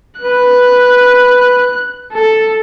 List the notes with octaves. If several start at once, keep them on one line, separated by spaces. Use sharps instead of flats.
B4 F#6
A4